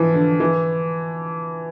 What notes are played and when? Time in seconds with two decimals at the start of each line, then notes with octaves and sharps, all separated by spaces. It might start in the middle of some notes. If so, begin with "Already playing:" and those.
Already playing: E3 F3
0.14 D3
0.40 E3